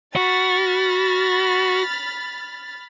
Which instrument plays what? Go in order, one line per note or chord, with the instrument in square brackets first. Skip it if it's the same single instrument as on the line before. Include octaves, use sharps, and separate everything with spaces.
[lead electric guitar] F#4 [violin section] B5 F6 A6